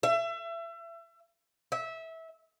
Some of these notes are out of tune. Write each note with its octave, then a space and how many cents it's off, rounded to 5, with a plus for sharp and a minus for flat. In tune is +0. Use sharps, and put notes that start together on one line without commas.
E5 +30
E5 -20